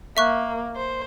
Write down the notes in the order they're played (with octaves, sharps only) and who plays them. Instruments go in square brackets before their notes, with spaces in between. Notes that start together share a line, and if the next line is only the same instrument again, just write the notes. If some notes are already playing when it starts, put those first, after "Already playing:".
[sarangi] A#3 [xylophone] E5 C#6 F#6
[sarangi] C5